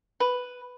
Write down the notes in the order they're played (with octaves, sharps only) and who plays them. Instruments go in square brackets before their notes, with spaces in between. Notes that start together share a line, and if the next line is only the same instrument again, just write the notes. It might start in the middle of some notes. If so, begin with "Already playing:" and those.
[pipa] B4